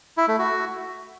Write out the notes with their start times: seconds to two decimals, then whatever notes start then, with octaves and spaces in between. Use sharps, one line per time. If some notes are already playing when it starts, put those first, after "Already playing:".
0.18 E4
0.28 A3
0.39 F#4